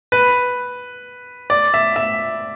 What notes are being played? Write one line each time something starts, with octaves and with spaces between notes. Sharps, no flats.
B4
D5
E5
E5